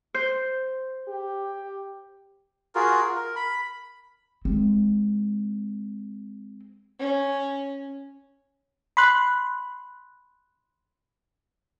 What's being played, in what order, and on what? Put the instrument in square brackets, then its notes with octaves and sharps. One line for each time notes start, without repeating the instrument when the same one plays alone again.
[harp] C5
[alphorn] G4
[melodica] F4 F#4 G#4 A#4
A#4
B5
[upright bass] G#3 C4
[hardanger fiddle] C#4
[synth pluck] B5 C6 F#6